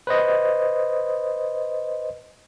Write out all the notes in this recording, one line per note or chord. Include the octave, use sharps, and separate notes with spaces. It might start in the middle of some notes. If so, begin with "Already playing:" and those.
B4 C5 D#5